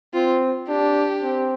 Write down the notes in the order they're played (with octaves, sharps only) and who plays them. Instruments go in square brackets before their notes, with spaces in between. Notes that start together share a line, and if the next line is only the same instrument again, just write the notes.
[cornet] C4 [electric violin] F4
[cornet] D4 [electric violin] G4
[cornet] C4